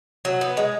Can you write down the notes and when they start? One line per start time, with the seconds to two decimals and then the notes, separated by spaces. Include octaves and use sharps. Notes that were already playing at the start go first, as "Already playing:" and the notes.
0.25 F#3
0.41 B3
0.57 G#3